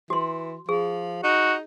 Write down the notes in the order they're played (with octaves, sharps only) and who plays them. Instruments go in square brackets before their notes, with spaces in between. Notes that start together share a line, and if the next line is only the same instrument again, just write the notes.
[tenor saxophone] E3 [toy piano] F#4 C6
[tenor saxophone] F3 [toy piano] G#4
[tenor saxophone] D#4 [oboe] F#4